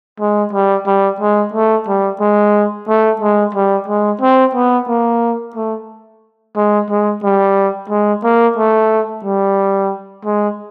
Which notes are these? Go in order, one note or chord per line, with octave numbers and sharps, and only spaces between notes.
G#3
G3
G3
G#3
A3
G3
G#3
A3
G#3
G3
G#3
C4
B3
A#3
A3
G#3
G#3
G3
G#3
A#3
A3
G3
G#3